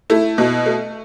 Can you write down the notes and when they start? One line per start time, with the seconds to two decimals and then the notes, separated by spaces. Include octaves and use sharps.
0.10 A3 E4
0.38 B2
0.66 A3